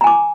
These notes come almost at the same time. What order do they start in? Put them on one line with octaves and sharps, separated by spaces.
A#5 G#5 D6